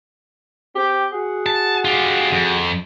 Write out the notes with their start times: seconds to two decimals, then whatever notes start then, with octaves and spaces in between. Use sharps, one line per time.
0.76 C4 G4
1.13 F#4 G#4 F#5
1.46 A5
1.85 F4 G4
2.33 F2